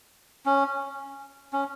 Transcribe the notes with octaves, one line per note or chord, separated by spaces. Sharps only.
C#4
C#4